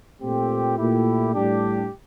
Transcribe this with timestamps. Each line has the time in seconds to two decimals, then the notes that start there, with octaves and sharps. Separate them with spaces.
0.21 A#2 A3 C4 G4
0.78 A#2 A3 E4 G4
1.34 A2 G3 D4 G4